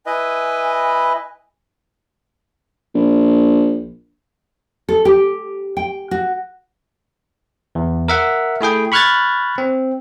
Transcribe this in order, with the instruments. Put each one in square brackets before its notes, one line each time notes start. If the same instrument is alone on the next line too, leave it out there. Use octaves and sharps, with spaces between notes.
[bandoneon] E4 B4 D#5 [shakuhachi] G#5
[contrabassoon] A#1
[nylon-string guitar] A4
G4
G5
F#4
[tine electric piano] E2
A#4 E5 F#5
A3 E4 G#4 G5
B5 C#6 F6 F#6 G#6 A6
C4